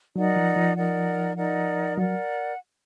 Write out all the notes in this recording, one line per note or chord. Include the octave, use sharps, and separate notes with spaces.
F#3 D#4 A#4 D5 F#5
F3
F3
D#4 A#4 D5 F#5
D#4 A#4 D5 F#5
F#3 A#4 D5 F#5